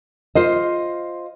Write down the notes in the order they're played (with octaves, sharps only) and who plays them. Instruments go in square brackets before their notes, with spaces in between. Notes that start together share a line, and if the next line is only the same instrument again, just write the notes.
[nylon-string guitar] F4 C5 D#5